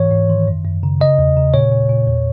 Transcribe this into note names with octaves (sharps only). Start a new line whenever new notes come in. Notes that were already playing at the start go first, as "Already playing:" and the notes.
Already playing: G#2 E3 C#5
G#2
D#3
F#2
F#2
C#3
C#3 D#5
E2
C#3
A#2 C#5
A#2
A#2
E2